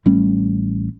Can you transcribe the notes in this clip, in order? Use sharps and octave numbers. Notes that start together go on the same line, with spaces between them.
A1 G3 A3 C#4